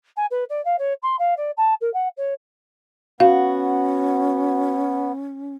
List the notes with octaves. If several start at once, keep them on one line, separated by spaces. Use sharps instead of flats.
G#5
B4
D5
F5
C#5
C6
F5
D5
A5
A#4
F#5
C#5
B3 C#4 F#4 F5